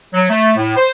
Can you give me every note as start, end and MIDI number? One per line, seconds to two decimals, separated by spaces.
0.13 0.27 54
0.30 0.52 57
0.57 0.74 45
0.76 0.91 72